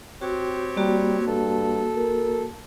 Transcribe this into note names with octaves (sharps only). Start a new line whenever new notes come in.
C4 F#4 G4 C#5
G3 A#3 F#4
G2 A4
A#4